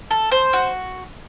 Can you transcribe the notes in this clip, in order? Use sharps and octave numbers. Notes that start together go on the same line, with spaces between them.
A4
C5
F#4